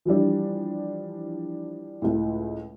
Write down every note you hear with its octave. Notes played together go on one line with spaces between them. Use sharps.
E3 F3 G3 D4
C#2 A2